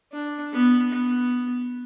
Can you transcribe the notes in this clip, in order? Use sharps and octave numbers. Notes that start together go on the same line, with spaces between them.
D4
B3
B3